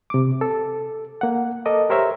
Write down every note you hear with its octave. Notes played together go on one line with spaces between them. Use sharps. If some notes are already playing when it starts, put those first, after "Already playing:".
C3 D6
A4
A#3 F#5
A4 A#4 D#5 D6 D#6
G4 A#4 C5 C#5 E5 A#5